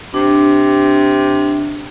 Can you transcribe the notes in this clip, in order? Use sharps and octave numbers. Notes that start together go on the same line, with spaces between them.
C3 D4